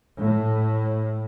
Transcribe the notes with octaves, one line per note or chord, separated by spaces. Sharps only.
A2